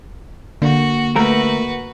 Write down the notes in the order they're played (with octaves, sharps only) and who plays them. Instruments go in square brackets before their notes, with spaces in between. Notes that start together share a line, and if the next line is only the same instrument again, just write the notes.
[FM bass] D3 [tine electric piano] A#3 [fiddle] F#4
[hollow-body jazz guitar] A3 A#4 [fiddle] F#4 B4